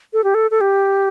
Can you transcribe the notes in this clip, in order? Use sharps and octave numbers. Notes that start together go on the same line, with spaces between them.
A4
G4
A4
A4
G4